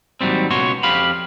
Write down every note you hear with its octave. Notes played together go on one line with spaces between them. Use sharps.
D#2 G#2 D#3 F#3 G3 C4
C#2 B2 F#4 C#5 C6
F2 G4 F5 B5